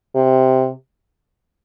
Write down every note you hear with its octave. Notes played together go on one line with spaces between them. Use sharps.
C3